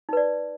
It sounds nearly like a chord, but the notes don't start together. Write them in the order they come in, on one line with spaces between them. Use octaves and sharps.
D#4 B4 D5